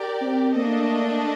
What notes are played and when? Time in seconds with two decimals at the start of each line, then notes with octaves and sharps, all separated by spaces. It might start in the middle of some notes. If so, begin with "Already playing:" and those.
Already playing: G4 A#4 D5
0.21 C4
0.55 A3 A#3 D4 A4 D#5